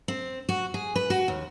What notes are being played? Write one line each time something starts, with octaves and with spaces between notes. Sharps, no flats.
C4
F#4
G#4
B4
F#4
D#2